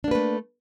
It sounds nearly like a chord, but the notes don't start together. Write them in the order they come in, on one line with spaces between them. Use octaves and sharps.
D4 A#3 B4 A3